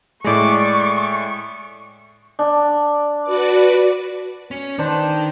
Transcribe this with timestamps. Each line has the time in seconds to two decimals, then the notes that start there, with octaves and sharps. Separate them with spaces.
0.24 A2 G#3 D5 C#6
2.39 D4
3.23 F#4 B4 D5
4.51 C#4
4.79 D#3 D4 C5